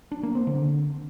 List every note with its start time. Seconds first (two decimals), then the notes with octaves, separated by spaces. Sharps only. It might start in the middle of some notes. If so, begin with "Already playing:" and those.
0.12 D4
0.23 A#3
0.35 C4
0.47 D3